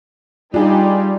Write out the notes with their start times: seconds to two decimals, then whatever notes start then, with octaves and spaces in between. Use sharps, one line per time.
0.54 G3 D4 D#4 F4 G#4